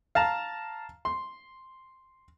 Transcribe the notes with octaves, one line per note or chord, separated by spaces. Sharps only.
F5 A5 A#5
C6